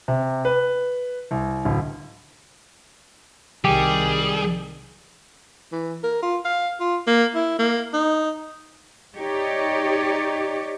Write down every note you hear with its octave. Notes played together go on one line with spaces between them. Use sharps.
C3
B4
C2
D1
C2 D#3 G3 G4 G#4
E3
A#4
F4
F5
F4
A#3
E4
A#3
D#4
D#4 G4 C#5 D5